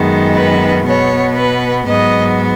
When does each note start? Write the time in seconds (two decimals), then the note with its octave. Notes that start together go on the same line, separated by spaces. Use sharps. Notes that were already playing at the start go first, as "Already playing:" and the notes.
Already playing: F#2 D#3 G#3 B3
0.35 B4
0.85 B2 B3 C#5
1.36 B4
1.86 G#2 F#3 B3 D#5